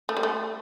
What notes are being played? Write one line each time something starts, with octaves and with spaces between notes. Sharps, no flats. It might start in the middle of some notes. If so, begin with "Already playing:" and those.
A3
G3
A3